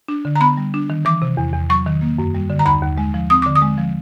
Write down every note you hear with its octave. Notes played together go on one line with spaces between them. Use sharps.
D4
D3
A#5
B3 B5
G3
D4
D#3
E3 D6
C3
E2
E2
F#3 C#6
D#3
A#3
F#2
G3
D3
A#5
D#2 B5
D#2
G#3
F3
C4 D#6
D3 D6
D#6
G#3
F3